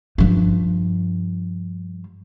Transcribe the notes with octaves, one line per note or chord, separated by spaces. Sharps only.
G2 F3